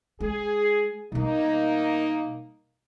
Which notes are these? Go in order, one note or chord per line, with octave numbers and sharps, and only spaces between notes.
G#3 G#4
B2 G3 A#3 D#4